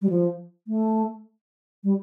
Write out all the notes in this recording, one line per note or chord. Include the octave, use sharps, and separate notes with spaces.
G3
F3
A3
G3